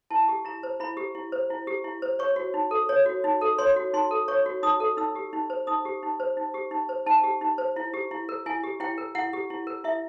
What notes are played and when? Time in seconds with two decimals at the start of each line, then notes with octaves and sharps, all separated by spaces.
0.10 E4 A5
0.28 G4
0.45 E4 A#5
0.63 C5
0.80 E4 B5
0.97 G4
1.15 E4
1.32 C5
1.50 E4
1.67 G4
1.84 E4
2.02 C5
2.19 C#5 C#6
2.36 F#4
2.54 D#4
2.71 A4
2.89 C#5
3.06 F#4
3.24 D#4
3.41 A4
3.58 C#5 C6
3.76 F#4
3.94 D#4 C6
4.11 A4
4.28 C#5 C#6
4.46 F#4
4.63 D#4 D#6
4.80 A4
4.97 D#4 E6
5.15 G4
5.33 D#4
5.50 C5
5.67 D#4 D#6
5.85 G4
6.03 D#4
6.20 C5
6.37 D#4
6.54 G4
6.71 D#4
6.89 C5
7.06 D#4 A5
7.24 G4
7.41 D#4
7.58 C5
7.76 E4
7.94 G4
8.11 E4
8.29 A#4
8.46 E4 G#5
8.63 G4
8.80 E4 G5
8.98 A#4
9.15 E4 F#5
9.33 G4
9.50 E4
9.67 A#4
9.84 E4 E5